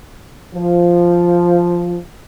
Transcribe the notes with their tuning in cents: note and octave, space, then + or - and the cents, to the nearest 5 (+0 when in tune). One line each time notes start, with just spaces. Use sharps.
F3 -5